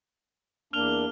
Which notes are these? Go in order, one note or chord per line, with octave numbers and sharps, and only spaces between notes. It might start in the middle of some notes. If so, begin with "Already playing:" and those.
E2 A#3 D4 F6 F7 G7